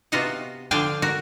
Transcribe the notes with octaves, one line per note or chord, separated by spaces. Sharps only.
C3 B3 F4 F#4 D#5 F#5
D3 F3 D4 F5 G5 G#5
F#4 A#4